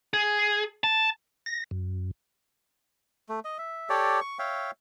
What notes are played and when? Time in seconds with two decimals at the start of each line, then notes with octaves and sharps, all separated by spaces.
0.14 G#4
0.84 A5
1.46 A#6
1.71 F#2
3.29 A3
3.45 D#5
3.58 E5
3.89 G4 A4 C#5 D5
4.21 C#6
4.39 C#5 E5 F5 G5